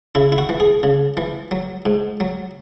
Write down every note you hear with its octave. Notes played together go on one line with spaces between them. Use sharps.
C#3 E4
E4
F#4
E3
G#4
C#3
E3
F#3
G#2
F#3